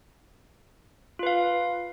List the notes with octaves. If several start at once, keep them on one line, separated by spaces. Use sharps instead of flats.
F4 B4 F5